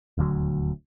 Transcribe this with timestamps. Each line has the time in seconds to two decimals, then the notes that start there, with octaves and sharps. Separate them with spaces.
0.18 D#1 D2 D3 F#3